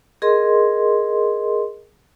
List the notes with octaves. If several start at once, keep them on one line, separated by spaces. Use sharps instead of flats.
G#4 A#4 D#5 C6